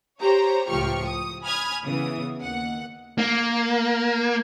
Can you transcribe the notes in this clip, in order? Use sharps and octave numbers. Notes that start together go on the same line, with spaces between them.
G4 C5 C#5 A#5
C#2 A2 F3 G4 C#6 F6
D#6
G#5 B5 D#6 F6 G#6
C#3 E3 B3 D#6
D#2 F#5
A#3